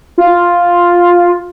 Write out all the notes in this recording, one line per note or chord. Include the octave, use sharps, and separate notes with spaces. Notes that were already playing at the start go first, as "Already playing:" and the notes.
F4